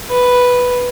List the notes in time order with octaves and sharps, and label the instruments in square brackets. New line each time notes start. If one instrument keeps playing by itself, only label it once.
[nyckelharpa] B4